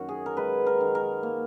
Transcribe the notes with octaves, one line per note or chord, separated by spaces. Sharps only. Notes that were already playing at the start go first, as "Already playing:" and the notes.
Already playing: F#2 D#3 F#4
G#4
A#4
G#3 B4
A#4
D#3
A#4
A#3